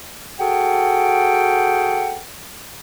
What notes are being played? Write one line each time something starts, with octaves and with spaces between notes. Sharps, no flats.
F#4 G#4 A4 F#5 G5